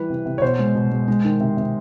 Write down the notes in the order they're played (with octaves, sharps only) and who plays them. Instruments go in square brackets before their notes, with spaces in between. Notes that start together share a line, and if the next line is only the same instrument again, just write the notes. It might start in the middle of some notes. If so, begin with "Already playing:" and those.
Already playing: [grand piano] E3 G3 B4
C3
C3
C#5
B2 C5
G#3
B2
G#3
G#3
D#3
C3
C3